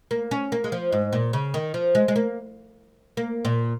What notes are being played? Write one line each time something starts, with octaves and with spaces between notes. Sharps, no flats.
A#3
C#4
A#3
G#3
F3
G#2
A#2
C#3
D#3
F3
G#3
G#3
A#3
A#3
A#2